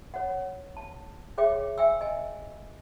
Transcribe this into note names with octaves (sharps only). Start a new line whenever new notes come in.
C#5 F#5
A5
G#4 C#5 E5 F5 G5 D6
E5 G5 G#5 E6
D#5 G#5